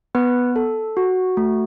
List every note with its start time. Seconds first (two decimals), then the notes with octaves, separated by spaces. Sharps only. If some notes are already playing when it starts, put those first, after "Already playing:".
0.15 B3 B4
0.56 A4
0.97 F#4
1.37 A3